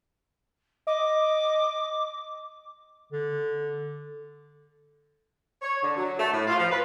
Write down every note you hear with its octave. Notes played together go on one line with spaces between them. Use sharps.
D#5 D6
D3
C#5
D3
F#3
A3
A2
F4
F3
B4